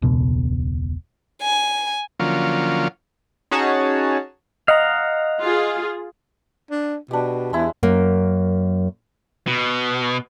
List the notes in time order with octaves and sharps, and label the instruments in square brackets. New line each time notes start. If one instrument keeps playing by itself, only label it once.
[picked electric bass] E1 C#2 B2
[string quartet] G#5
[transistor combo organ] D3 F3 F#3 A#3 C#4 F4
[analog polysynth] C#4 D#4 F#4 G#4 C#5 A5
[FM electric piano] D#5 [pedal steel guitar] F5 F#5 A#5
[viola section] F4 G#4
[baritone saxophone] D4
[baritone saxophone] B2 [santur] D4 G4
[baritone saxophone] E2 [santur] G#3 E4
[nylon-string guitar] F#2 A#3
[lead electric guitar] B2